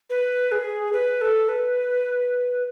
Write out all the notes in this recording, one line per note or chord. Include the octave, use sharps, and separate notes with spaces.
B4
G#4
B4
A4
B4